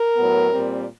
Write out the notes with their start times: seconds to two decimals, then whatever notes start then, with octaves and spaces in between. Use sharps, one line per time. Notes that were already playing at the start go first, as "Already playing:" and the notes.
Already playing: A#4
0.17 A2 F#3 B3
0.52 A#2 G3 C4